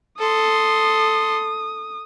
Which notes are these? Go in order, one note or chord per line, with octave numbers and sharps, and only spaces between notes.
A4 C6 D#6